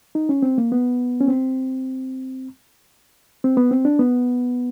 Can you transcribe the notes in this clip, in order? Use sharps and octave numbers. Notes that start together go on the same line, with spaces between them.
D#4
C#4
C4
A#3
B3
C#4
C4
C4
B3
C4
D4
B3